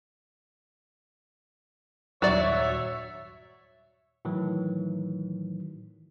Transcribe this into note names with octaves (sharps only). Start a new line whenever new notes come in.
D#1 G2 F#3 C#5 D5 E5
A2 D#3 E3 F#3